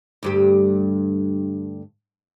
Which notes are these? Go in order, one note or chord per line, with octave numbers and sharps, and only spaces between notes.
D2 G2 G4